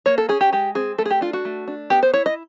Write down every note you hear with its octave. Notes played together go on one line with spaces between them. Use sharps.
A#3 C#5
A4
C#4 G#4
G4
G#3 G4
C4 G#4
A3 A4
G#4
G4
D4 F4
F#4
A3
D4
B3 G4
C5
E4 C#5
D#5